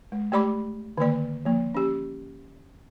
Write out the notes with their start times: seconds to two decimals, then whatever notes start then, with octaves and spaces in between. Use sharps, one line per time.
0.12 G#3
0.32 A3 G4 D5 B5 D6
0.98 D3 D#3 A#3 D5
1.45 F3 A#3
1.75 C#4 G4